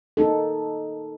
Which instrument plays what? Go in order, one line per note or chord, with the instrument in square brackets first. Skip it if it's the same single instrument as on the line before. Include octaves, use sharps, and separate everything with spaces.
[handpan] A#3 D#4 A4